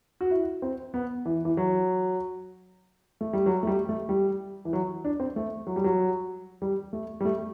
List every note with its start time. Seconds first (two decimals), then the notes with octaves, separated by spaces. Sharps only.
0.21 F#4
0.30 E4
0.62 C4
0.94 B3
1.25 E3
1.45 E3
1.57 F#3
3.21 A3
3.33 G3
3.46 F#3
3.63 A3
3.67 G3
3.89 A3
4.09 G3
4.65 E3
4.73 F#3
5.05 D4
5.20 C4
5.36 A3
5.67 F#3
5.76 G3
5.84 F#3
6.62 G3
6.93 A3
7.21 G3
7.25 A3